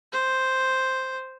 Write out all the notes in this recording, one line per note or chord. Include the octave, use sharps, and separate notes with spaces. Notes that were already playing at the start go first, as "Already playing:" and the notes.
C5